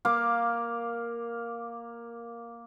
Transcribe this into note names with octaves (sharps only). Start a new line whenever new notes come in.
A#3 F5 D6